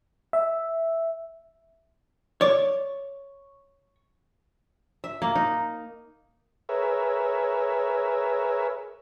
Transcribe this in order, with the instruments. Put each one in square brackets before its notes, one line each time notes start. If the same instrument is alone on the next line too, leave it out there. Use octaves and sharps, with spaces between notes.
[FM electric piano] E5
[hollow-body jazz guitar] C#5 [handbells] D5 D6
[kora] E5
A#3
D#4
[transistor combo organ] G#4 A#4 B4 C#5 E5